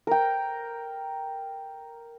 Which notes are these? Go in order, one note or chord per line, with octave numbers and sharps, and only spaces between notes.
A#4 G5